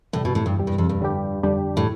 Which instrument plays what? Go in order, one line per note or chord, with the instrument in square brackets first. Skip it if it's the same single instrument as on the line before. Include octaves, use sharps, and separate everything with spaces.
[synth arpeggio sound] E2 C3 G3 [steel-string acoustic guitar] A2
[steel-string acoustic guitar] B2
A2
G2
[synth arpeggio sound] E2 C3 G3
[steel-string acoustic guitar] G2
F2
G2
[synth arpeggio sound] F2 D3 G3 D4 G4
F2 D3 G3 D4 G4
[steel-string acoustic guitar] A2